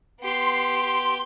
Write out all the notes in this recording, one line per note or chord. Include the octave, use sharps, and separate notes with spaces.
B3 G4 C6